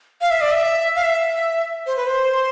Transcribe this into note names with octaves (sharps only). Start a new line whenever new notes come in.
F5
E5
D5
E5
F5
E5
C5
B4
C5